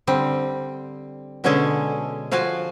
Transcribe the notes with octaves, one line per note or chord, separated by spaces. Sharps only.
D3 G3 C4
B2 D3 G#3 C#4 G#4 A4
F3 F4 F#4 F5 G#5